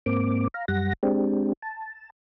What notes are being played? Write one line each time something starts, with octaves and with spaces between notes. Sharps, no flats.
G#2 A#3 C4 D6
F5 A#5
F#2 G3 F#5 A#6
G#3 C4 D4 G4
A5